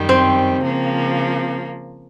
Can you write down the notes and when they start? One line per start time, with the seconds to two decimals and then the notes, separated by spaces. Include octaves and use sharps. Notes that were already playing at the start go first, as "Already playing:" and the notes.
Already playing: F#2 D#3 G3
0.09 C4
0.60 C#3 F3 A#3